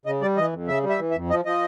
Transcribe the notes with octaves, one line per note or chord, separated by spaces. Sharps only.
C#3 D#5
G3 D5
E3 D#5
F2
C#3 E5
G3
E5
E3
E5
F2
F3 D#5
F3 D#5